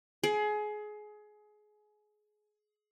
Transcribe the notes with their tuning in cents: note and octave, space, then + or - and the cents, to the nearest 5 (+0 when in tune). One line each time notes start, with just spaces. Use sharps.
G#4 +25